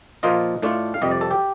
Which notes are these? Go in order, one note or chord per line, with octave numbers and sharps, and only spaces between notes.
A#2 F3 A#3 F4 D#5
A2 A3 D4 F4
F5
F2 C3 G3 D#5
D5
A4
G4